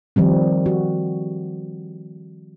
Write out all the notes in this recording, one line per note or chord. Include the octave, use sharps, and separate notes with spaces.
D#3 F3 G3 C4
F#4